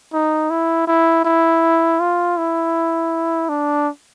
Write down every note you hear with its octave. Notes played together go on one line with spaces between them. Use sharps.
D#4
E4
E4
E4
F4
E4
D4